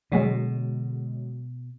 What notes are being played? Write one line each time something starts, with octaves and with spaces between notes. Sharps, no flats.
B2 D3 F#3 G#3